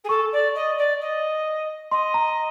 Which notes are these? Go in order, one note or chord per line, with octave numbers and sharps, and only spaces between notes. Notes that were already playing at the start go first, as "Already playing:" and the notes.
G#4
A4 C#6
D5
D#5
D5
D#5
D#5 C6
A#5